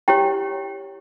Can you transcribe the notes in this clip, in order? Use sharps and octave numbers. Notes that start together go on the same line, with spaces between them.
E4 G4 C#5 G5